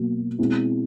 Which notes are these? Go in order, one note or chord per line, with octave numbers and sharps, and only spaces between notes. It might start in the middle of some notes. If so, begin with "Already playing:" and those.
Already playing: B2 F#3 A#3
B2 G#3 C4 E4